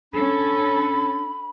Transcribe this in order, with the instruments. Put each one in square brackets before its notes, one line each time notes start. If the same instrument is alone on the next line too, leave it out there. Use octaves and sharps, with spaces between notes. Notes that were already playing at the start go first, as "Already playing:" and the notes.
[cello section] C#4 A4 [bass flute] D4 [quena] B5